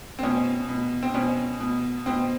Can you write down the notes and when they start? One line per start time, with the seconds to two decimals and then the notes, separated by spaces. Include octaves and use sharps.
0.19 C4
0.23 B2 C#4
0.68 B2
1.03 C4
1.14 B2 C#4
1.60 B2
2.06 B2 C4